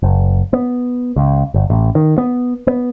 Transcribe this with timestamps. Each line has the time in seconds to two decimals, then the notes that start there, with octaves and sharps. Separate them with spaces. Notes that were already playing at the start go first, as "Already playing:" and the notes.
0.03 F#1
0.53 B3
1.16 C#2
1.54 G1
1.70 A1
1.95 D#3
2.18 B3
2.67 B3